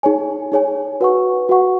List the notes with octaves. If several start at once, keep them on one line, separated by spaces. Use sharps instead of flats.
D#4 G#4 C#5 G#5
D#4 G#4 C#5 G#5
F#4 B4 F#5 C#6
F#4 B4 F#5 C#6